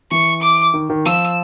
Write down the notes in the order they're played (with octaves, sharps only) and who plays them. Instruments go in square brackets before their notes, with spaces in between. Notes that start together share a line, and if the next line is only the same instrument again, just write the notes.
[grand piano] E3 [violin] C#6
[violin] D6
[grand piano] D#3
D#3
[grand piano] F3 [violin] E6